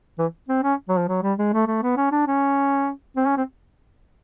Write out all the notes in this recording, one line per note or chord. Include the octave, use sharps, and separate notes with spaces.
E3
C4
C#4
F#3
F3
F#3
G3
G#3
A3
A3
B3
C#4
D4
C#4
C4
C#4
C4